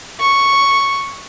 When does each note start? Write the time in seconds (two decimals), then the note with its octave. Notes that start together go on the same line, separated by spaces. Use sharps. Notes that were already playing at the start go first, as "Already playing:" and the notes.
0.20 C#6